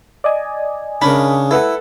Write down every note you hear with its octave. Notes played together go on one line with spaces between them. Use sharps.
D5 D#5 G#5
C#3 C#4 D4 A#4 B5
E4 A4 B4 F#5